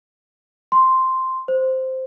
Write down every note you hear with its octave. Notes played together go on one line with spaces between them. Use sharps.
C6
C5